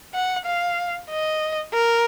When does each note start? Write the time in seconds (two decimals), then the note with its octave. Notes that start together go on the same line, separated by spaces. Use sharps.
0.15 F#5
0.46 F5
1.10 D#5
1.74 A#4